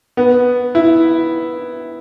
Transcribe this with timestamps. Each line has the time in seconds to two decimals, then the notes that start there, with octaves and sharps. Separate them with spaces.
0.17 B3
0.75 E4